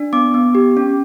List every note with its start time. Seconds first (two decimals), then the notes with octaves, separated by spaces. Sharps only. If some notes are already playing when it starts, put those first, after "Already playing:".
Already playing: D4
0.13 B3 D6
0.34 B3
0.55 G4
0.77 C#4